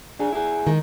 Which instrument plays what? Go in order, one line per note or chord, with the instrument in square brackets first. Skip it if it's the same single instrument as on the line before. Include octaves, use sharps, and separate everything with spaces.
[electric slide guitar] D4 G#4
E4 G#4
[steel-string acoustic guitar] D#3 G#3